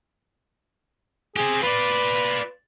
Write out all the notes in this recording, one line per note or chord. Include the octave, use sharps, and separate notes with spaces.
C4 G4 G#4
F4 B4 D5